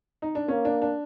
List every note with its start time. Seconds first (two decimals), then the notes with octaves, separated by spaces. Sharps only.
0.22 D#4
0.35 D4
0.47 A#3 C#4
0.65 D4
0.82 D4